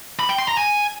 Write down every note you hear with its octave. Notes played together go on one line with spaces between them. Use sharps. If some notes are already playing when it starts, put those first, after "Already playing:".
B5
G5
C6
A#5
G#5